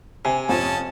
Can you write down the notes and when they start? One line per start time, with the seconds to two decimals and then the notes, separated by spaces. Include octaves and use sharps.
0.25 C3 G#5
0.49 F2 C#4 A5